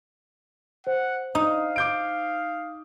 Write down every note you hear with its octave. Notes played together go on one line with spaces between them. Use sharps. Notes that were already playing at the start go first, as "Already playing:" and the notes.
C5 F#5
D#4 F5 D#6
D6 G6 D7